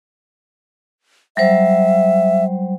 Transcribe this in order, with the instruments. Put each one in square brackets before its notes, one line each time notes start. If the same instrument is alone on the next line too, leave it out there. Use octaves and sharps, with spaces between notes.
[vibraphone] F#3 G3 C5 [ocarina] E5